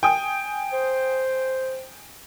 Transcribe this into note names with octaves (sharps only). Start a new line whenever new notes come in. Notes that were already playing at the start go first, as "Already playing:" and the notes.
G5 G#5 D#6
C5